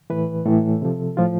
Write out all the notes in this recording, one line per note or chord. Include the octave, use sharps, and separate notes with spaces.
A2 E3 B4
A2 E3 A4
C3 F3
A2 F3 F4